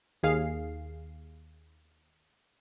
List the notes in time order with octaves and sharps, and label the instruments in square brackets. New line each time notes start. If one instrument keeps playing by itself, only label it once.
[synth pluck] D#2 G#4 F5 C7